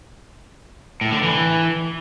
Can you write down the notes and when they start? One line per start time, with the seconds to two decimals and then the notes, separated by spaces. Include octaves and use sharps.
1.01 A2
1.12 D3
1.23 E3